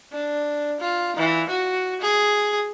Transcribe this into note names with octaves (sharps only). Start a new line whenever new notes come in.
D4
F4
E3
F#4
G#4